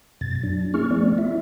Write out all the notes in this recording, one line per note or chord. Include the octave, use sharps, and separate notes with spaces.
F#2 B2 A6
F#3 D4
A#3 C#4 E4 G#4 C#6 F6
F3 A3 B3 C4 D5
E4 F4 E5